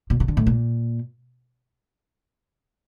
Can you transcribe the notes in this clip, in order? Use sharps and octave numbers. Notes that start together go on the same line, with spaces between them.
A#2
C3
D3
A2
A#2